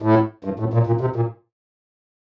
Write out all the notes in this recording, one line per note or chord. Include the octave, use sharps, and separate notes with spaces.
A2
G2
A2
A#2
A#2
C3
A#2